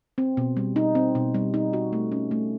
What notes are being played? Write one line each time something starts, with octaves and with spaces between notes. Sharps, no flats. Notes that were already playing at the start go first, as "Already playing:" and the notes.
C4
B2
G3
D#4
C4
B2
G3
D#4
F#4
A3
C#4
A3